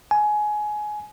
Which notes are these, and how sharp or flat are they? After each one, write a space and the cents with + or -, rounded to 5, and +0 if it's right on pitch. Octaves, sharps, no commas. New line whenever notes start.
G#5 +20